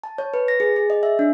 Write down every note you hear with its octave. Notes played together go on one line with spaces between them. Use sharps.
A5
C#5
B4
A#6
G#4
G#4
D#5
E5
D4